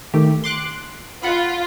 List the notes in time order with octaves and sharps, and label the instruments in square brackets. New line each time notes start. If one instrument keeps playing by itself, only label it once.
[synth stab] D#3 A3 G4
C6 D6 F#6
[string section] F4 [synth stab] F#5 B5